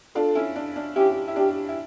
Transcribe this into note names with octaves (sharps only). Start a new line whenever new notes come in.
D4 F4 A4
C#4 E4
D4
D4
C#4 E4 G4
E4
D4 G4
E4